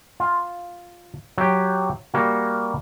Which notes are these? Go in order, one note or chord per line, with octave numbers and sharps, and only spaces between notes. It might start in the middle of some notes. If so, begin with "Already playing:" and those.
F4
F#3 G4
G3 A#3 F#4